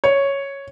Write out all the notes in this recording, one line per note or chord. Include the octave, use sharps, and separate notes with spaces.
C#5